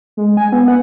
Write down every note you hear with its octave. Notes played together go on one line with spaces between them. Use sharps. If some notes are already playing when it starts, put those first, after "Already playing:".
G#3
G#5
B3
F#5